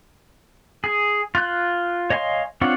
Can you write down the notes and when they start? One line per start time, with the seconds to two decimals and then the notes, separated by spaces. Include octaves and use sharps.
0.84 G#4
1.35 F4 F#6
2.10 C#5 D#5 F5 G#5 C6
2.61 C4 D4 F4 C#5 F#5